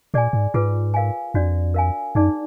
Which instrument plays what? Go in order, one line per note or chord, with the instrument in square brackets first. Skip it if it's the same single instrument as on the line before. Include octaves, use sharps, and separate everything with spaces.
[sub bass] A#2 [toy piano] G#4 D5 G#5
[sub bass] G#2
[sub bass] G#2 [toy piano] F4 G#4 B4
[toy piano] A#4 F5 G#5
[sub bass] F2 [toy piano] D4 F#4 D5
[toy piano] A#4 F5 G#5
[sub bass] F#2 [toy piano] D#4 G#4 D5